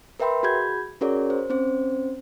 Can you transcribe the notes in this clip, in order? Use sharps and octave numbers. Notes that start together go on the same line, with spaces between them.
A#4 B4 E5 G5 B5 C6
F#4 G#4 B5 G6 G#6
C#4 F#4 G#4 A#4 C#5 D5
C5
C4 C#4 C5